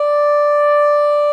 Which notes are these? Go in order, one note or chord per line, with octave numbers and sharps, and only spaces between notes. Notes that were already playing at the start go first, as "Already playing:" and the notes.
Already playing: D5